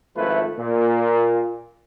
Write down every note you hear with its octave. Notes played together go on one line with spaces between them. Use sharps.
G#1 F3 A3 E4 F4 B4
A#2